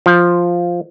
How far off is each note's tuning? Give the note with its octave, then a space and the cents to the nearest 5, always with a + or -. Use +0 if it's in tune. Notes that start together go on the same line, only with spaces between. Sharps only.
F3 +0